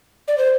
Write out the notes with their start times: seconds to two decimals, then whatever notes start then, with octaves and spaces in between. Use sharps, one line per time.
0.28 D5
0.38 C5